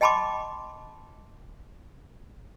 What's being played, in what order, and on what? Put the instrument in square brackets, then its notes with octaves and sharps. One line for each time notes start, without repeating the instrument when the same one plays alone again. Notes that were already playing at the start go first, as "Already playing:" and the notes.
[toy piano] D#5 G5 A5 B5 C6 D6